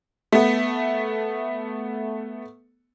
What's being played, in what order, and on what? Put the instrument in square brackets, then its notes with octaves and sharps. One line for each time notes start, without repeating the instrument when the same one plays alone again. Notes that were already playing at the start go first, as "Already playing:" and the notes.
[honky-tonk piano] A3 B3